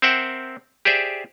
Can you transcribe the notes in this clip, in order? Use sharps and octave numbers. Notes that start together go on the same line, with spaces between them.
C4 A#4 C5 E5 F#5 G5
G4 G#4 C5 D5 E5